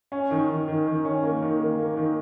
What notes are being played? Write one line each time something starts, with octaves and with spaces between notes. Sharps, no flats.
C#4
D#3
D#3
D#3
D#3
C#4
A#3
D#3
A#3
A#3
D#3